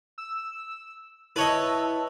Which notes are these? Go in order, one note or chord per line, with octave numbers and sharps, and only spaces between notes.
E6
E4 B4 C#5 D#5 A5 E6